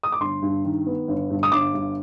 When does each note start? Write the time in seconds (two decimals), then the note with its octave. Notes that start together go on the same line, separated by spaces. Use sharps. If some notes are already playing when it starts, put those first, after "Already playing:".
0.03 D#6
0.12 D6
0.20 G1 C6
0.42 G2
0.64 D#3
0.87 B3
1.08 G1
1.30 G2
1.43 D#6
1.52 G1 D6
1.74 G2